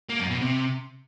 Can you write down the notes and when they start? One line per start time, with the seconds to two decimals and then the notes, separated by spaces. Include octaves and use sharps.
0.09 A#3
0.20 F#2
0.30 B2
0.41 C3